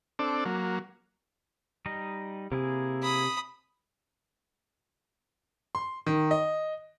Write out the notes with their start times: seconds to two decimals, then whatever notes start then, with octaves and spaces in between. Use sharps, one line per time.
0.19 C4 D4 A4 D5
0.45 F#3 A#3
1.86 G3 D#4 D#5
2.52 C3 A#3 E4 G#4
3.03 B5 D#6
5.75 C6
6.06 D#3
6.31 D#5